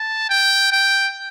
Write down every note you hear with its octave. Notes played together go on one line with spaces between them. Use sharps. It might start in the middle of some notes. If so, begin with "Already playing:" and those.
Already playing: A5
G5
G5